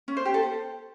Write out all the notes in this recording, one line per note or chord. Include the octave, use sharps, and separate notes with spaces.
C#4
C5
G4
A4
C5